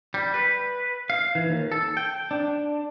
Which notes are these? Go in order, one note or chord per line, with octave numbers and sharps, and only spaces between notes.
G3
B4
F5
E3
D#2
A4
G5
D4